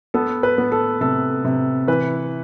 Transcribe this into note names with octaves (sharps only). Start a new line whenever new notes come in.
B3 A4
B4
B3
A4
C3 A4
C3
E3 B4